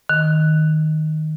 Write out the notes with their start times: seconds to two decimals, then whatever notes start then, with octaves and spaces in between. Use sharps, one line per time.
0.09 D#3